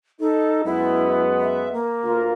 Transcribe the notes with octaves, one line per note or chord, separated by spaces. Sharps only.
D#4 A4
F#2 G#3 B3 E4
E5
A#3
D2 F4 A#4